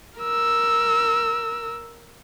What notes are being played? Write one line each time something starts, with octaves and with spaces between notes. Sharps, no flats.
A#4 E6